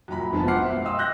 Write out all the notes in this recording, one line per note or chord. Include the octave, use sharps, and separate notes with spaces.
F#2 A#2 A#5 B5
F#1 F3 G#3 B3 A5
C5 F#5 C6 D6 F6 C7
B2 E5
D#5 F5 G5 C6 D#6 E6
F#6 G6 A#6